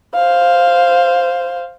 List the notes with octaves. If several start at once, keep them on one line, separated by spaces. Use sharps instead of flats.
C5 F5